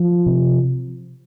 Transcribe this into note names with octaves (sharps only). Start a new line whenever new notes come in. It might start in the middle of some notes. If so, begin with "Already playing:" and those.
Already playing: F3
C3